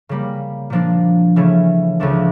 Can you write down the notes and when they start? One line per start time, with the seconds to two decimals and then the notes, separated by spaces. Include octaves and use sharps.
0.09 C#3 G3 A#3
0.70 A#2 F3 A#3 D4
1.36 C#3 E3 A3 C#4
2.00 C#2 C#3 F3 A3 D4